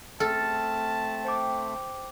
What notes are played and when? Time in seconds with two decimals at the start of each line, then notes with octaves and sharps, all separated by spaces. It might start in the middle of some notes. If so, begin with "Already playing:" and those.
0.20 A3 C4 A4 A5 F6 A6
1.25 C5 G5 D6